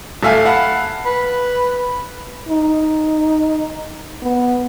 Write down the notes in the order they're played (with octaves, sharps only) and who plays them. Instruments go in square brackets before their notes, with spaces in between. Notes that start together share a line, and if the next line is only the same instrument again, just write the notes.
[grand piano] D1 A3 A4 E5 F5 G#5
F5 F#5 A5 B5
[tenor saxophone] B4
[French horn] D#4
B3